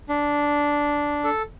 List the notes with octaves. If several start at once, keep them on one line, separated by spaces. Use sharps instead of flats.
D4
A4